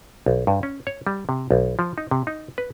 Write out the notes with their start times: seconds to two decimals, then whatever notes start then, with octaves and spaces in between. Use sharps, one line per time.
0.26 B1
0.47 G2
0.63 C#4
0.87 C#5
1.07 G3
1.29 C3
1.51 B1
1.79 F3
1.98 D#4
2.11 C3
2.27 D#4
2.58 B4